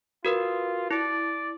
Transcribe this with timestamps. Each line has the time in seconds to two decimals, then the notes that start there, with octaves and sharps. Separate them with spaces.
0.25 F4 F#4 A#4 B4
0.91 E4 D5